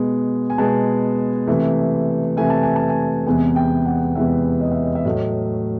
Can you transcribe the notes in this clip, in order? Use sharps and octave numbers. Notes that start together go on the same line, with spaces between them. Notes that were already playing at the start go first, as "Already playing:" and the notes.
Already playing: B2 G#3 B3
G#5
B2 G#3 B3 A5
C3 E3 A3
C3 E3 A3 G#5
A5
G#5
A5
G#5
E2 C3 E3 G#3 B3 G#5
G5
F#5
E2 C3 E3 G#3 B3 E5
D#5
E5
D#5
E5
A2 F#3 A3 D#5